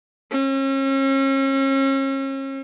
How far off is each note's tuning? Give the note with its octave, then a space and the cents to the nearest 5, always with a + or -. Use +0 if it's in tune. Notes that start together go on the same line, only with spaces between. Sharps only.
C#4 -40